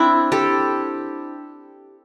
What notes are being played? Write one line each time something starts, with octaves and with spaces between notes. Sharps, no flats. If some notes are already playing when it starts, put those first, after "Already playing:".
Already playing: C4 D4 E4
G4 A4